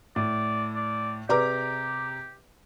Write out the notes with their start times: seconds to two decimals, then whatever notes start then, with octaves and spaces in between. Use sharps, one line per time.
0.16 A2 D5
0.75 D5
1.29 C3 G4 G#4 B4 D5 A#5 D6